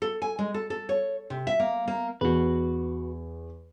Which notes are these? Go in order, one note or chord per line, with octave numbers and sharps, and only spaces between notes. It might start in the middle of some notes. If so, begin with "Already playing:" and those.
A4
G#5
G#3
A4
A4
C#5
C3
E5
A#3
A#3
E2 F#4 B4